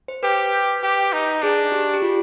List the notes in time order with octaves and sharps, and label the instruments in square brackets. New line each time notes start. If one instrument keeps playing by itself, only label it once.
[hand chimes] C5
[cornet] G4 [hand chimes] B4
[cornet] G4
D#4
[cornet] D4 [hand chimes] G#4
[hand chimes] G4
G4
F4